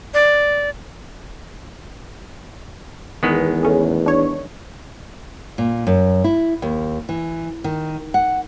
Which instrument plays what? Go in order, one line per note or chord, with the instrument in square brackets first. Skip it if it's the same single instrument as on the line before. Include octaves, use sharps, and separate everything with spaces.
[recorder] D5
[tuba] E2 [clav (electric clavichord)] D#3 G#3 B3
[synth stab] A3 C#4 G#4
D4 C#5
[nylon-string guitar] A#2
F#2
E4
D#2
E3
D#3
F#5